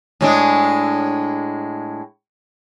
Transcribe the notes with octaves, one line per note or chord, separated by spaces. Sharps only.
A2 G#3 D4